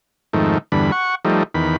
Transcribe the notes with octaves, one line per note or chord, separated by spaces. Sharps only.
F2 G#2 D#3 A3
E2 G2 D3 B5
F#5 C#6
F3 G3 A3 D#4
E2 D#3 B5